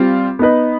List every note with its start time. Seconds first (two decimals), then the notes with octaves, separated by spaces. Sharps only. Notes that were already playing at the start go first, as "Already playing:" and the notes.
Already playing: G3 C4 F4
0.39 B3 D#4 B4